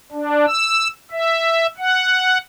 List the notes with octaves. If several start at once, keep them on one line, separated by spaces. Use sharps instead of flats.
D4
E6
E5
F#5